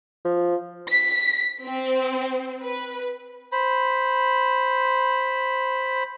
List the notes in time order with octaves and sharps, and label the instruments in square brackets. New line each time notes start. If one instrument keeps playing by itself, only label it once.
[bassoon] F3
[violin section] B6
C4
B4
[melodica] C5 B5